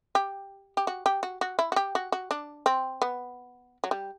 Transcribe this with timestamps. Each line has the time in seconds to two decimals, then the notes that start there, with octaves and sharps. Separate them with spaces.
0.15 G4
0.77 G4
0.87 F#4
1.06 G4
1.23 F#4
1.41 F#4
1.59 E4
1.72 F#4
1.76 G4
1.95 F#4
2.12 F#4
2.31 D4
2.66 C4
3.02 B3
3.84 F#3
3.91 G3